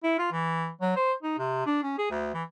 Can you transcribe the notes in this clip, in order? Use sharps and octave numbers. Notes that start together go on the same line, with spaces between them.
E4
F4
E3
F#3
C5
D#4
C3
D4
C#4
G#4
D2
E3